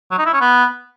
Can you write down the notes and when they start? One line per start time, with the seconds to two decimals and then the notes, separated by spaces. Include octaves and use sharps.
0.11 F#3
0.19 D#4
0.26 E4
0.33 C#4
0.41 B3